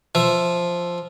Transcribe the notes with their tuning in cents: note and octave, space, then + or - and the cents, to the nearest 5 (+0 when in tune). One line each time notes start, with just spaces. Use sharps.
F3 +0 E5 +10